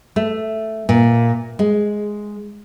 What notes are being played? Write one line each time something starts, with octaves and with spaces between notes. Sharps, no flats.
A3
A#2
G#3